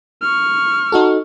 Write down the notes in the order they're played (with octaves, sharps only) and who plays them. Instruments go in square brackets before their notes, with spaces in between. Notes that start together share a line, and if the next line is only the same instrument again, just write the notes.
[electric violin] C#6 F6
[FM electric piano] D#4 F#4 A4